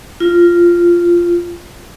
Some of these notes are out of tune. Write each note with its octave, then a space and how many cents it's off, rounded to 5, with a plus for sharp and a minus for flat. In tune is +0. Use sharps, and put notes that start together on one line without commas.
F4 -10